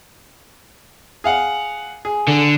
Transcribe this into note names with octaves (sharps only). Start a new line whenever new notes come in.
G#4 F5 F#5
G#4
D3